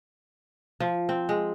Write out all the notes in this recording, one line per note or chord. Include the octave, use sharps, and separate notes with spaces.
F3
C4
G#3